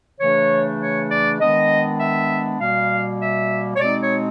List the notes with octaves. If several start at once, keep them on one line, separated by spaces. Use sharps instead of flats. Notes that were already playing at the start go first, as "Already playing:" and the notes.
C#3 E3 A3 D4 C#5
C#5
D5
D#3 G#3 B3 D4 D#5
E5
B2 G3 A#3 F5
E5
C#5
B2 G#3 C4 D#4 D5
C#5